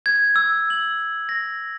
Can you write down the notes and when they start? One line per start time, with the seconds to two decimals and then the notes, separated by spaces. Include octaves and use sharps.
0.06 G#6
0.36 E6
0.70 F#7
1.29 A#6